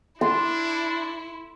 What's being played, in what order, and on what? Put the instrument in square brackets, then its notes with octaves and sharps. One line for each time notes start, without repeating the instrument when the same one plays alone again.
[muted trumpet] D4 [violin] E4 [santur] C6